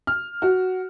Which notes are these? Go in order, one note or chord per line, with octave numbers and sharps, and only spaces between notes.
F6
F#4